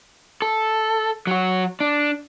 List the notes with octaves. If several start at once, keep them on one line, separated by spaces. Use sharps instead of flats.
A4
F#3 F#4
D4